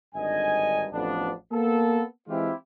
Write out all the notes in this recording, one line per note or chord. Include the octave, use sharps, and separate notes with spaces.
G#1 G2 D3 D#5 G#5
A1 F2 F3 B3 D4
A#3 B3 A4
E3 G#3 C4 E4 F4 G4